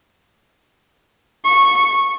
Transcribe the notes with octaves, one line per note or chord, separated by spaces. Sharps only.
C#6